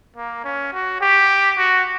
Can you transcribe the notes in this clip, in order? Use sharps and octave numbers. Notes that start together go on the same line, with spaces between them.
A#3
C#4
F#4
G4
F#4